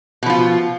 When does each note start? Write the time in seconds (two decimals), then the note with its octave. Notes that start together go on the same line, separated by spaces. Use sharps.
0.23 B2
0.26 F3
0.30 F4